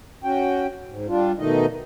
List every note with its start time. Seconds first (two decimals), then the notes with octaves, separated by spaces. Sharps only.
0.24 C#4 F#4 G5
0.88 G#2
1.08 G3 D4 F4
1.39 B2 D#3 A3 D#4 D#5